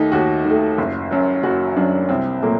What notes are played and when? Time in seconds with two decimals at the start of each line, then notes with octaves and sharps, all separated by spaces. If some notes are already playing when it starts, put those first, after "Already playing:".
Already playing: D#2 D#3 A3 D#4 G4
0.12 D#2 F#4
0.45 D#3 A3
0.78 F#1
1.11 F#2 F#3
1.43 F#1 F#4
1.76 F#2 F#3 D4
2.09 C2 C4
2.42 A#2 F#3 A3 A#3